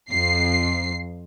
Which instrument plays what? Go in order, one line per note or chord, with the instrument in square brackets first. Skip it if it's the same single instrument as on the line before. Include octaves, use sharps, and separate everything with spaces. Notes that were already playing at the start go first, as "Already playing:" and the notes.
[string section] F2 C7